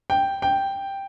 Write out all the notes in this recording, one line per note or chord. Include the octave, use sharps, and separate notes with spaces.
G5
G5